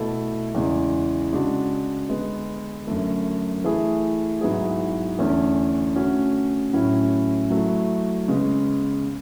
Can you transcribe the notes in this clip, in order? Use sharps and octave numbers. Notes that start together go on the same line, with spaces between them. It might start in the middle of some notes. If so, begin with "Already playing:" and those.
Already playing: B2 A3 E4 A4
E2 C#3 E3 G#3
C#3 G#3 D4 F#4
D3 G#3 B3
F#2 D3 A3
E3 A3 E4 G#4
G#2 F#3 B3 E4 G#4
E2 D3 A3 C#4
D3 A3 C#4 F#4
A2 F#3 C#4 E4
F#3 A3 E4
C#3 G#3 B3